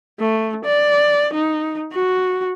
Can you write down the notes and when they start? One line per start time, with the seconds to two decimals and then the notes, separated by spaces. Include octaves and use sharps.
0.20 A3
0.65 D5
1.34 D#4
1.92 F#4